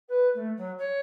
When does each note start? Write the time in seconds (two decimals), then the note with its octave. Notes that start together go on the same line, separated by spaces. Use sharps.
0.08 B4
0.34 A3
0.57 F#3
0.78 C#5